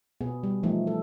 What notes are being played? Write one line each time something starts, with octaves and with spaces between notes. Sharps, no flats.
B2 B3 G#4
G3
E3 F3 A3 D#4
A4